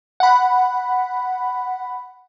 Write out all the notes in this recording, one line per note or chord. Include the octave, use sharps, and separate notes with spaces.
F#5 B5